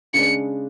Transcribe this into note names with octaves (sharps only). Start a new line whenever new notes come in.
C#3 G#3 D4 C#7